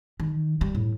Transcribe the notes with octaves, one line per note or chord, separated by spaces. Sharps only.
D#3
G3
A2